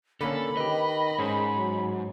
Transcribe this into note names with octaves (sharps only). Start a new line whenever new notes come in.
D3 A#3 C#4 A4 B5
D#3 G4 B4 D#5
G#2 C#4 G#4 C5
F#3